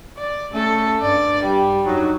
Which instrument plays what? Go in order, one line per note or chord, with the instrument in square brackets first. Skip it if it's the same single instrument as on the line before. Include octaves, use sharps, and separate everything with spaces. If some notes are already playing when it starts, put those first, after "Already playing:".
[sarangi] D5
[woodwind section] A3 C#4 [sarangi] A4
[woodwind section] G2 [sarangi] D5
[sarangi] G3
[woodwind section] F2 D4 D#4 [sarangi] F#3